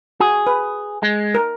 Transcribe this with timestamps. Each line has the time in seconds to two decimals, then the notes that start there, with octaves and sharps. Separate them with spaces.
0.20 F#4 G#4
0.47 B4
1.03 G#3
1.35 A#4